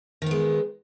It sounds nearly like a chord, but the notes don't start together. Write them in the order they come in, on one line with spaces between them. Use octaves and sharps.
D#3 B3 G#3